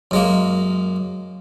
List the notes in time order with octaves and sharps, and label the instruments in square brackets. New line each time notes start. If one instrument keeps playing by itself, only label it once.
[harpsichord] F#2 G#3 A#3